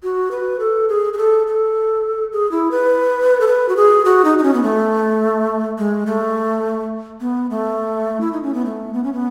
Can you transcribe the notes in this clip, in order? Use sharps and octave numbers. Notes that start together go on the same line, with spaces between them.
F#4
B4
A4
G#4
G#4
A4
A4
G#4
E4
B4
A4
B4
F#4
G#4
F#4
D#4
D#4
C#4
B3
A3
G#3
A3
B3
A3
E4
D#4
C#4
B3
A3
B3
C#4
B3